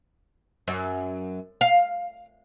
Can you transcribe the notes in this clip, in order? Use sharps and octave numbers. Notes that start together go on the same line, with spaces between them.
F#2
F5